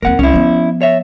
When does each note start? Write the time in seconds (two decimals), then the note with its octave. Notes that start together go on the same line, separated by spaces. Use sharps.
0.02 D#2 C4 A#4 F#5
0.19 C2 C#4 E4
0.33 F3 B3
0.82 C#5 E5